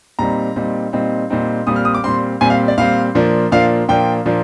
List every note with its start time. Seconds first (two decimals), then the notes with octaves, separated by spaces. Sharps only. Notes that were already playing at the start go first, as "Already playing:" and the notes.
0.19 A#2 G3 C4 D#4 A#5
0.56 A#2 G3 C4 D#4
0.93 A#2 G3 C4 D#4
1.30 A#2 G3 C4 D#4
1.67 A#2 G3 C4 D#6
1.76 F6
1.85 D#6
1.95 D6
2.04 A#2 G3 C4 C6
2.41 A#2 G3 C4 G#5
2.50 F5
2.68 D5
2.78 A#2 G3 C4 F5
3.15 A#2 F3 A#3 D4
3.52 A#2 F3 A#3 D4 F5
3.89 A#2 F3 A#3 D4 G5
4.26 A#2 F3 A#3 D4